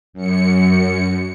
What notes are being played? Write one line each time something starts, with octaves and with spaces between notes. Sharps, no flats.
F#2 C#7